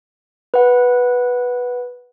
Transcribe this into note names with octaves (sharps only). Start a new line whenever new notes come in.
B4 F#5